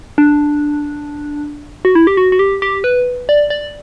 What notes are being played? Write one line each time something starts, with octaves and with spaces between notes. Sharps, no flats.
D4
F#4
E4
G4
F#4
F#4
G4
G4
B4
D5
D5